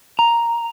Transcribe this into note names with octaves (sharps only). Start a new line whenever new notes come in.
A#5